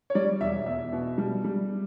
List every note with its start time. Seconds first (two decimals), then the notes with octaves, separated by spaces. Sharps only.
0.10 C#5
0.15 G3 D5
0.41 E1 E5
0.66 E2 E5
0.93 B2
1.18 G3
1.44 G3